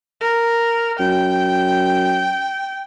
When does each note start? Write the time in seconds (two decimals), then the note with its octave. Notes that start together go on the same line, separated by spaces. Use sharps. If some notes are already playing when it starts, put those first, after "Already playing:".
0.21 A#4
0.99 F#2 G5